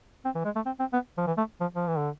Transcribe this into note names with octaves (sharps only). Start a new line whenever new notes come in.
C4
E3
G#3
A3
C4
C4
B3
F3
E3
A3
F3
F3
E3
D3